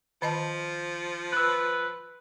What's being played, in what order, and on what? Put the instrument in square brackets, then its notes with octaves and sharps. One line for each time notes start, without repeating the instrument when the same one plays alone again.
[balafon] D#3 D#5 A5 [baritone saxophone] F3
[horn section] B4 [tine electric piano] E6 F#6